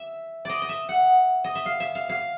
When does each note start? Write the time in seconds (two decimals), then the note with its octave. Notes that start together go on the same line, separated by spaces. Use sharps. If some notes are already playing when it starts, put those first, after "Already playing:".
Already playing: E5
0.45 D5 D#5
0.62 D#5
0.69 E5
0.89 F#5
1.44 D#5
1.55 E5
1.66 F5
1.80 E5
1.95 F5
2.09 F5